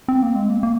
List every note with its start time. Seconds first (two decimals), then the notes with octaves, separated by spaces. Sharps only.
0.08 C4
0.22 A#3
0.35 G#3
0.50 A#3
0.63 A#3